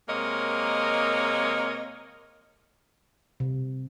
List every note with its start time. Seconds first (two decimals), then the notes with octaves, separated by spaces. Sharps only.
0.09 C3 G#3 A#3 A#4 C#5 D#5
3.40 C3